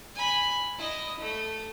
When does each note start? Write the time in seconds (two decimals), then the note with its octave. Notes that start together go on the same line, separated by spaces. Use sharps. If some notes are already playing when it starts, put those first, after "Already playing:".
0.15 G#5 B5
0.79 E4 D#5
1.20 A3